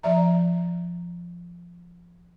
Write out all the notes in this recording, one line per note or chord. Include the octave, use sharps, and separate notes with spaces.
F3 D5 E5 A#5